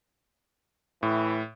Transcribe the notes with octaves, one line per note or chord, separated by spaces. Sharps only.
A2 E3